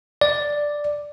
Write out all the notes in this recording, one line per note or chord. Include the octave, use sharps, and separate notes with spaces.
D5